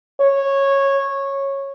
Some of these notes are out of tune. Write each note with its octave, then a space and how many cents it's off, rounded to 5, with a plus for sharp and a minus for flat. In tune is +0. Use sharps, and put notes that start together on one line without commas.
C#5 -10